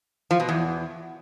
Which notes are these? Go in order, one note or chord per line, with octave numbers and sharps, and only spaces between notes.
F3
B2
E2